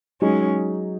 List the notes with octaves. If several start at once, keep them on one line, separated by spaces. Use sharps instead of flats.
F#3 G#3 C#4 D#4 G#4